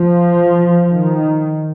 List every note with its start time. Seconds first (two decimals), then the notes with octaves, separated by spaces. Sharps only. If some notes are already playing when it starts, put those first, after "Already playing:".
Already playing: F3
0.91 D#3